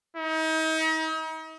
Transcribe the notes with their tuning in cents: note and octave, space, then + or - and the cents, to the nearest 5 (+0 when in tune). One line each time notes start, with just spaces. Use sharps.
D#4 +40